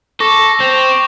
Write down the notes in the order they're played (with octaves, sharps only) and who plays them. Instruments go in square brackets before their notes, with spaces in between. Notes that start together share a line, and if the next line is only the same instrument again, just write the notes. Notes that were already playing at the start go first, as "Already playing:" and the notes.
[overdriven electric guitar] A4 [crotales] C#6 D6 A#6
[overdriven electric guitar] C4 [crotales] G6 F7